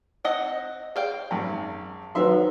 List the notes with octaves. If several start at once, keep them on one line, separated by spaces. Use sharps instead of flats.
C4 D#5 F#5
G#4 C5 D5 F5 G5
G#1 F#2
D#3 F#3 A4 B4 C5 E5 C6